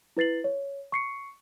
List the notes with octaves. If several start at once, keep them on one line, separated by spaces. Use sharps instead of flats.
E4 B4 A6 C7 F#7
C#5
C#6 C7 C#7